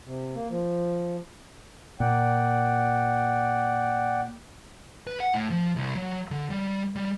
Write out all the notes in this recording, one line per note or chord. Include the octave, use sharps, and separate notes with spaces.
C3
A#3
F3
A#2 D5 F#5 G5
B4
F#5
A2
F3
C2
F#3
D3
G3
G3